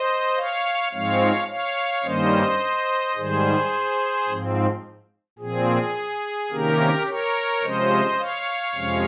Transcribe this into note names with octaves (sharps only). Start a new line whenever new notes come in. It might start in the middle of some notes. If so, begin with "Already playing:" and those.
Already playing: C5 D#5
C#5 F5
G#2 F3 G#3 C4 C#5 F5
C#5 F5
G2 D#3 G3 A#3 C#4 C5 D#5
G#2 D#3 G3 G#4 C5
G#2 F3 C4
A#2 F3 C4 G#4
C3 D#3 A#3 C#4 G4 A#4
A#4 C#5
C3 F3 G#3 C#4 C5 D#5
C#5 F5
F2 C3 F3 G#3 C#4